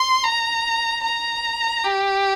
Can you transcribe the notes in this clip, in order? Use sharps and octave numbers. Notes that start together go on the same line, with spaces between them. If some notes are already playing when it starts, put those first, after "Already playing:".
Already playing: C6
A#5
A#5
G4